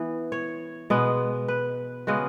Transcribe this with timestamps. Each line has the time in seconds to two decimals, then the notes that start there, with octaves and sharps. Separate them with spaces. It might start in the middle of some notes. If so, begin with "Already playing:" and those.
Already playing: E3 B3
0.32 C#5
0.90 B2 G#3 B3
1.48 B4
2.07 C#3 G#3 B3 F#4